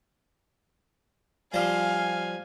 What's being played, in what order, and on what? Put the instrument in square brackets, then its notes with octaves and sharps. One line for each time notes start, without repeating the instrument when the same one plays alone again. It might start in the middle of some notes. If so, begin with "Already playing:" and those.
[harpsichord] F3 G3 C5 [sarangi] F5 [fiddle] G#5